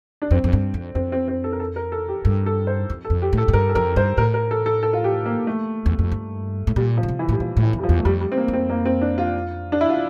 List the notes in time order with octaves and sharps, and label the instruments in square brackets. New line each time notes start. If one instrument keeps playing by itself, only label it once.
[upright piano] D4
[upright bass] F2 [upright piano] C4
[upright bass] F2
G2
F2
[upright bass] F2 [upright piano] C4
[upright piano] C4
C4
A4
A#4
A4
A#4
A4
G4
[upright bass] G2 [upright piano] A4
[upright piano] A4
C5
[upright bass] F2
[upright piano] A4
[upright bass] F2
[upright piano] G4
[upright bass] A2
[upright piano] A4
[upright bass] A2
[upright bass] G2 [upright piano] A#4
[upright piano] A4
[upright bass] F2 [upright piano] A#4
[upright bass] G2 [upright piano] C5
[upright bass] A2 [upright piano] A#4
[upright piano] A#4
A4
A4
A4
F4
G4
A#3
A3
[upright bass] E2
F2
G2
A2
[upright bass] A#2 [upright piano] G3
[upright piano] F3
[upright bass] A#2
C3
[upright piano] E3
[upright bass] A2 [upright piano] G3
[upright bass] A#2 [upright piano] F3
[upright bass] A2
[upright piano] E3
[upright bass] F2
[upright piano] G3
F3
[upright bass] E2
[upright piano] A3
[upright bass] F2 [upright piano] G3
[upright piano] G3
C4
A#3
[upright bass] F2
[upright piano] C4
A#3
C4
D4
F4
D4
E4
F4